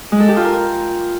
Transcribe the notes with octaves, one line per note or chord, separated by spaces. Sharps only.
G#3
A4
G4
F4
A#4